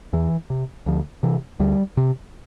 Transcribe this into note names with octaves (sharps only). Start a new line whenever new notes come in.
E2 E3
C3
D2 F3
C3 E3
D2 G3
C3